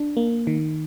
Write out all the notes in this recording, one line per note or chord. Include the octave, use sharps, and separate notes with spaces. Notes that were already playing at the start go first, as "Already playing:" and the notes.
Already playing: D4
A#3
D#3